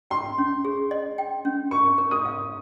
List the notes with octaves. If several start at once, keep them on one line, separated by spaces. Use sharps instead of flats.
G5 C6
C#4
G#4
D#5
G5
C#4
A#4 C#6
A#4
D#6
F5